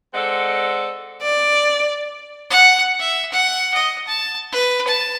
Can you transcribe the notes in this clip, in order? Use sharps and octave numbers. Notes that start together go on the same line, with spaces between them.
G#3 C4 A4 D5 D#5 F#5
D5
F#5
E5
F#5
D#5
A5
B4
A5